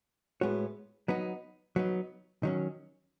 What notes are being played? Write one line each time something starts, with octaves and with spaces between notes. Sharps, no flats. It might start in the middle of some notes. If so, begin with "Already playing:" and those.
A2 G#3 B3 F#4 C#5
F#3 B3 D#4
F#3 B3 D#4
D#3 F#3 C#4